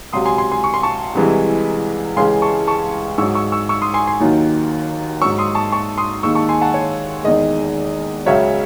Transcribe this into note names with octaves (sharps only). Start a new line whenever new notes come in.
C#2 C3 F#3 C6 D#6
G#5 C6
G#5 C6
G#5 C6
C#6
C6
A5 C#6
C2 C3 E3 G#3
C#2 C#3 E3 G#3 G#5 C6
A5 C#6
A5 C#6
G#2 F#3 C#6 E6
C#6 E6
C#6 E6
C#6 E6
C6 D#6
G#5 C6
G#5 C6
D#2 D#3 F#3
G#2 F#3 C#6 E6
C6 D#6
A5 C#6
A5 C#6
C6 D#6
D#2 D#3 G#3 C#6 E6
A5 C#6
G#5 C6
F#5 A5
C#5
E2 D#3 G#3 D#5
C#2 C#3 F#3 C#5 E5